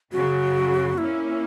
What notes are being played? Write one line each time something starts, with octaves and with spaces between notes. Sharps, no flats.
F#2 C#3 F#3 F#4
A#2 A#3 C#4 E4